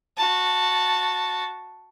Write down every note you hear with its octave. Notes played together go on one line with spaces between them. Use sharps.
F#4 A5